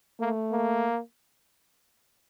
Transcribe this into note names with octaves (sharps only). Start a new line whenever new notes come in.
A3 A#3
A#3